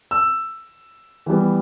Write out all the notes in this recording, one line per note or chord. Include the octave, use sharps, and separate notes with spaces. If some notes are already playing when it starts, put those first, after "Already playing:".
E6
E3 G3 B3